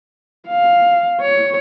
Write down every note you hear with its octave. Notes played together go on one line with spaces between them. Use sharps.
F5
C#5